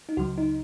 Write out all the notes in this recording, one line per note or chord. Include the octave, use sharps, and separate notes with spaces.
D#4
C#2 C#3 F#3 F#4
D#4